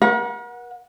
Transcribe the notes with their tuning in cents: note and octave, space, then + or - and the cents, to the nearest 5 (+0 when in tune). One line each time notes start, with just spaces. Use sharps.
A#4 +45 F#5 -15